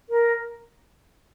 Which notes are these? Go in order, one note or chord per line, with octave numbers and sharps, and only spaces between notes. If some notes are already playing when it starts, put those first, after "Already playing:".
A#4